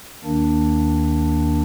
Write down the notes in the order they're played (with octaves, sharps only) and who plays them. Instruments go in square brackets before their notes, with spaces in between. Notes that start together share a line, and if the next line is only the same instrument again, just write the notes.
[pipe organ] D#2 D#3 A#3 D4